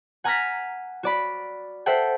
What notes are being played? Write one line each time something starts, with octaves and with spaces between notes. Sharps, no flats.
F#5 G#5 A#5 F6 A#6 B6
F#4 D5 B5
A4 C5 E5 F#5 G5